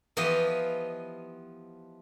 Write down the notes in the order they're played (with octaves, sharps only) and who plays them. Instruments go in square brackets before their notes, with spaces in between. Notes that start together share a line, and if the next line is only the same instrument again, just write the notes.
[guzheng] E3 F3 B3 F4 G4 D#5